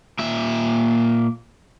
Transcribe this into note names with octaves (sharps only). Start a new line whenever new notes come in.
A#2 E5